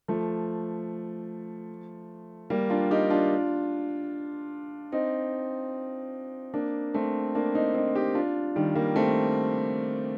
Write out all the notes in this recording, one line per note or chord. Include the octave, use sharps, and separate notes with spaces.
F3 A3
G3 A#3
D4 F4
D#4 G4
D4 F4
C4 D#4
A#3 D4
A3 C4
A#3 D4
C4 D#4
C4 D#4
D#4 G4
D4 F4
D#3 G3
G3 A#3
A3 C4